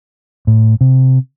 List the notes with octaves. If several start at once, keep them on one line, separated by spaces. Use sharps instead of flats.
A2
C3